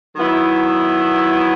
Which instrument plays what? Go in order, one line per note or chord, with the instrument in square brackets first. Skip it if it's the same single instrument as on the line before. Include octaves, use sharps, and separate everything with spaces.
[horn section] D#3 F#3 B3 E4